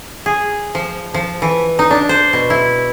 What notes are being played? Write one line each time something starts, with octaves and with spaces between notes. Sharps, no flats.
G#4
F3
F3
E3
D#4
D4
C5
B2
E4